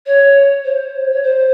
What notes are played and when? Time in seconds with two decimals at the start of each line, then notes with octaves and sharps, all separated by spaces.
0.06 C#5
0.64 C5
1.12 C#5
1.23 C5